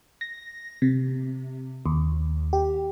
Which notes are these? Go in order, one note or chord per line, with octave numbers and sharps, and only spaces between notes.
A#6
C3
D#2
G4